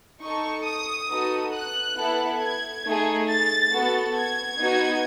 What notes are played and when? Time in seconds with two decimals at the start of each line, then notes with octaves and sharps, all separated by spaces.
0.21 D#4 A4 C#6
0.66 D#6
1.09 B3 D#4 F#4 A4
1.54 F#6
1.97 B3 E4 A4
2.41 G#6
2.85 A3 D#4 G#4
3.28 A6
3.72 B3 F#4 A4
4.17 G#6
4.60 B3 D#4 F#4